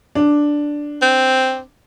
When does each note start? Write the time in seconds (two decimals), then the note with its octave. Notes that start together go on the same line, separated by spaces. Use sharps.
0.15 D4
1.02 C4